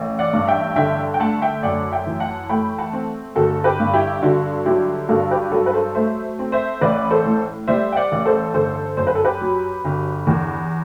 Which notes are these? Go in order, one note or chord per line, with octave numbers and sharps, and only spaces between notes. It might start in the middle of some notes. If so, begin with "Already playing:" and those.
Already playing: A1
D5 F#5
G2
E5 G5
D3 E5 G5
G5
A3 F#5 A5
E5 G5
F#2 D5 F#5
E5 G5
E3
F#5 A5
A3 G5 B5
F#5 A5
C4
G1 F#4 A4
G4 B4
G2
E4 G4
D3 F#4
F#3 E4 G4
G2 F#4 A4
G4 B4
F#3 F#4 A4
B4
A4 C5
A3 C5 E5
C4
C5 E5
A1 B4 D5
A4 C5
A2
G3 C5 E5
G5
D5 F#5
A1
A4 C5
G1 A4 C5
F#2 C5
B4
A4
G4 B4
F#3
G1
E2